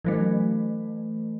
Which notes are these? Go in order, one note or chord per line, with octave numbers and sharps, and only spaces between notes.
E3 F#3 A3